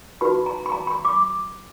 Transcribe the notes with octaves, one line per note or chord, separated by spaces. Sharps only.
D#4 F#4 B4 B5
A#5
B5
A#5
B5
D6